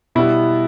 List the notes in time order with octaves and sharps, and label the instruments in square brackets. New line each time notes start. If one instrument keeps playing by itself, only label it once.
[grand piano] B2 G3 B3 E4